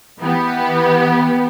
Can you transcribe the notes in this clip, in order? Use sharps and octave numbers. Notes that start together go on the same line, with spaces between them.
E3 B3 G4